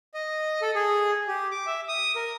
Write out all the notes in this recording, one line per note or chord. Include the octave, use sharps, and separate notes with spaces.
D#5
A4
G#4
G4
D6
E5
D#6
A#4